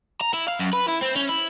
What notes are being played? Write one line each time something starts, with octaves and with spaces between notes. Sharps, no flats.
A#5
E4
F5
F#2
B4
E4
C4
C#4
E4